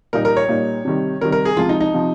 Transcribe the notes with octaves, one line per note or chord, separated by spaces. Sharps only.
A#2 G3 A#3 D#4 A#4
A#4
C#5
A#2 G3 A#3 D#4
C3 D#3 G3
C3 D#3 G3 A#4
A#4
G#4
C#2 C3 F3 F4
D#4
D#4
C3 F3